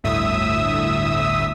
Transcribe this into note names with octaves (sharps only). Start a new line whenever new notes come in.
G1 D2 A2 E5 D#6 E6